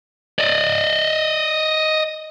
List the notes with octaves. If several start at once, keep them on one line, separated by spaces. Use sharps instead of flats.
D5 D#5